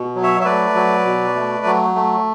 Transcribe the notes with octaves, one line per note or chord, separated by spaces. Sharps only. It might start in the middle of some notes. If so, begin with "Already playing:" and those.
Already playing: B2
F#3
C#5 E5
E5
A3 B4 D5
F#3
B2
A3
F#3
A3